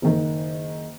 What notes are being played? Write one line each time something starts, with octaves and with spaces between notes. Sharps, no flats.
F#1 D#3